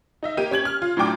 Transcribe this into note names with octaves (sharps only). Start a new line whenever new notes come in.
D#4 D#5 E5
A#3 G4 D#7
C#4 G4 G#6 F#7
F6
F4
A2 F#3 D4 G5 D6